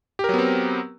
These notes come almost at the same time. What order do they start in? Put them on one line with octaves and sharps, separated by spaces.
G4 A#4 F#3 B3 C4